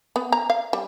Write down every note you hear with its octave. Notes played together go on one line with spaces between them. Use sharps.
B3
A#5
F5
G3